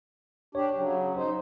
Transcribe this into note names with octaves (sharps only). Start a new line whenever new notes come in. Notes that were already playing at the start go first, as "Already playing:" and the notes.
D4 G4 C#5
C#3 F#3
D#4 C5